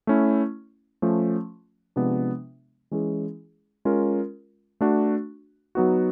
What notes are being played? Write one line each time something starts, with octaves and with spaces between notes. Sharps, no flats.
A3 C#4 E4
F3 A3 C#4
C3 F3 G#3 B3 D4
E3 G#3 C#4 E4 G#4
G#3 C#4 F4 A#4
A3 D4 F#4
F#3 B3 D#4 F#4